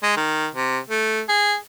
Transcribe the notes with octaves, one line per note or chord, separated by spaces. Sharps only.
G#3
D#3
C3
A3
G#4